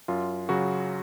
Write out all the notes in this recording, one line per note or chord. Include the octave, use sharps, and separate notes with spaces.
F#2 F4
C#3 F#3 F#4